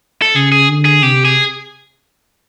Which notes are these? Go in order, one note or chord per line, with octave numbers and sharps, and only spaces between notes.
A4
C#3 G#4
G#4
D3
G#4
C3 G4
G#4